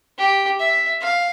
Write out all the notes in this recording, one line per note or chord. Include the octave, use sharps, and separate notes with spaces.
G4
E5
F5